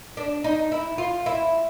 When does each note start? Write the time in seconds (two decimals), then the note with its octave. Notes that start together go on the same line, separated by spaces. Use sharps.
0.17 D4
0.44 D#4
0.72 E4
0.98 F4
1.26 E4